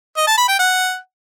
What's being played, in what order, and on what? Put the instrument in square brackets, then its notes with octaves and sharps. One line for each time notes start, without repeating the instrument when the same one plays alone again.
[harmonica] D#5
A5
B5
G5
F#5